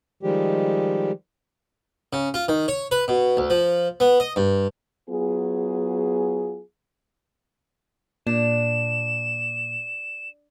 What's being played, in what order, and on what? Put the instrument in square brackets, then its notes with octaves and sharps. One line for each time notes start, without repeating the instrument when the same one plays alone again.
[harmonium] D#3 F3 G3 G#3 G4
[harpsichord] C#3
F4
D#3
C#5
B4
B2
D2
F3
B3
D#5
G2
[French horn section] F#3 B3 F4 G#4
[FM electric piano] A#2 [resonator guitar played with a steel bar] D4 [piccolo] E7